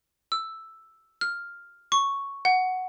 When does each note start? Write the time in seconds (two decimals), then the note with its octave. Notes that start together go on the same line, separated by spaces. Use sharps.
0.32 E6
1.21 F6
1.92 C#6
2.45 F#5